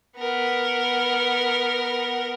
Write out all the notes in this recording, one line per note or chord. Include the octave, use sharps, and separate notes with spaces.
B3 A#4